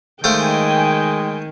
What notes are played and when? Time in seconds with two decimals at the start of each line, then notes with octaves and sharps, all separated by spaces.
0.24 D#3 G#3 A3 C5 F5 G5 G#5